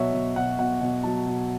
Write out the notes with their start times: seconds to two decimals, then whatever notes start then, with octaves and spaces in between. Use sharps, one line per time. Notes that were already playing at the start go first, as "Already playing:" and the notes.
Already playing: B2 F#3 F#4 C#5 E5
0.14 B2
0.36 B2 F#5
0.59 B2 F#5
0.81 B2
1.03 F#3 A5
1.26 B2